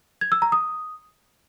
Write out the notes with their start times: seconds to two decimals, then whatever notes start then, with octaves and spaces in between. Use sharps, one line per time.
0.21 G#6
0.32 E6
0.42 A#5
0.52 D#6